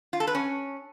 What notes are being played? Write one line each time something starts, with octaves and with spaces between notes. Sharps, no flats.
F4
A4
B4
C#4